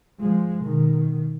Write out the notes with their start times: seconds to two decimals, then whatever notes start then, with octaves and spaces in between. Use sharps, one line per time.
0.20 F3 G#3
0.64 B2 D#3